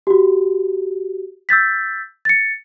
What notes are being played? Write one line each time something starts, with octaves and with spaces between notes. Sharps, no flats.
F#4 G4
E6 G6 A6 B6
A6 C#7